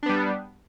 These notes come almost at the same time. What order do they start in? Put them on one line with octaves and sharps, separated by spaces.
D4 B3 G3